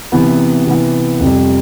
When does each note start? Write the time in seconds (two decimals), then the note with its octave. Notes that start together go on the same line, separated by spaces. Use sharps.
0.12 C3 E3 B3
0.67 C3 E3 B3
1.20 F2 C3 G3